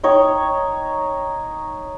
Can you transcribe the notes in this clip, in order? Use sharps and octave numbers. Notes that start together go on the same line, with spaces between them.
D#4 C#5 G5